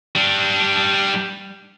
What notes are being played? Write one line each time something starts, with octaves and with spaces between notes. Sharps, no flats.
G3 D4